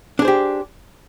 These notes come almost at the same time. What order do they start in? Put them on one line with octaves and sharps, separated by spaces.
D4 G#4 C5 G4